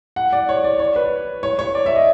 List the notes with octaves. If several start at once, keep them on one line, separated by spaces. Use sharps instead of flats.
F#5
D5
C#5
D5
C#5
B4
C#5
C#5
D5
E5
D#5